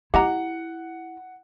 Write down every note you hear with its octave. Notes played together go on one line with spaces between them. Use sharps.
E4 G4 D#5 F#5 A#5